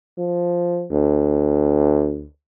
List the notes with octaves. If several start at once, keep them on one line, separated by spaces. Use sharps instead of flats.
F3
D2